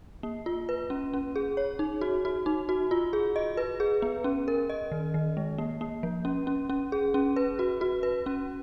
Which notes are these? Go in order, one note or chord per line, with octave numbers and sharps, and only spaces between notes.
A#3
F4
B4
C#4
C#4
G#4
C#5
D#4
F#4
F#4
D#4
F#4
F4
G#4
D#5
B4
G#4
B3
C#4
A#4
D#5
D#3
D#3
G#3
A#3
A#3
F3
C#4
C#4
C#4
G#4
C#4
B4
F#4
F#4
B4
C#4